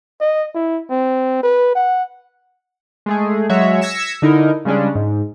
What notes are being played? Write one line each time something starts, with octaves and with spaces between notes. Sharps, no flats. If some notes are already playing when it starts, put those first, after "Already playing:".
D#5
E4
C4
B4
F#5
G#3 A3 G#4
F#3 G#3 F#4 C#5 E5
E6 G#6 A#6 B6 C#7 E7
D3 D#4 E4 A#4
C#3 G3 G#3 C#4 D4
G#2